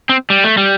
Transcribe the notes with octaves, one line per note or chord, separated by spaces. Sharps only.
C4
G3
A3
G3